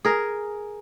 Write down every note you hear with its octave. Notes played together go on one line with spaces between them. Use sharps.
G#4 A#4